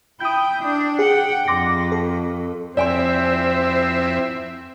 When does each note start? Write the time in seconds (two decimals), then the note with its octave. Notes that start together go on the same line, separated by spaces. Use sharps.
0.20 E4 G5 D#6 G6
0.62 D4
0.99 G#4 F#5 G5
1.48 F2 C6 D6 A#6
1.92 A4
2.77 F2 C4 E4 C5 D5 E5 G#5 C6